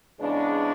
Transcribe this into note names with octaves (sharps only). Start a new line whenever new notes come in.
E2 C#3 G#3 D4